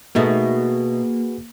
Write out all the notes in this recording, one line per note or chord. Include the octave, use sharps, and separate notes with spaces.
B2 A3 A#3 D#4 F#4 G#4 B4